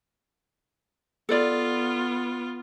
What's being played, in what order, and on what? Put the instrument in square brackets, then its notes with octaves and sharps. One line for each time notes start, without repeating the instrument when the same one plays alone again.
[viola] B3 F4 [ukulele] A4 D5